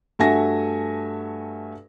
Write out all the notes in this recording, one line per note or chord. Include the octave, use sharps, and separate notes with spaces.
G2 A3 F#4 E5 G#5 A#6